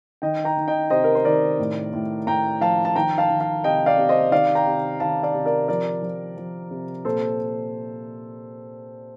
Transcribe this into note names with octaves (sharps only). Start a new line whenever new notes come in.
D#3 D#5 G5
G5 A#5
D#3
D#5 G5
C3 C5 D#5
A#4
C5
D#3 A#4 D5
A2
A2
A2 G5 A#5
F3 F5 A5
A5
D#3 G5 A#5
F5 A5
D#3
F5 A5
C3 D#5 G5
D5 F5
C3
C5 D#5
D#3 D5 F5
G5 A#5
C3
D#3 F5 A5
D5 F5
C3
A#4 D5
F3 A#4 D5
F3
F3
C3
A#2 A4 C5